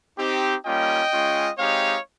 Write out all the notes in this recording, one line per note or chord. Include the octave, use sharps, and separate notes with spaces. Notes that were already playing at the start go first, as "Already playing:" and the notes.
C4 D#4 G4
G3 A#3 C#4 F4 D#5 G5
G#3 C#4 F4
G#3 C4 D#4 G4 C#5 F5